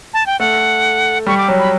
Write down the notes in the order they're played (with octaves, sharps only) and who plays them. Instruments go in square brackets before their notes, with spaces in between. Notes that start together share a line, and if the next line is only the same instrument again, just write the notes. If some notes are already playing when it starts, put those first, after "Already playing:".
[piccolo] A5
G5
[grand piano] A3 [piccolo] F#5
[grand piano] G3 [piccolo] C#6
[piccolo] D6
[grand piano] F#3
[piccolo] B5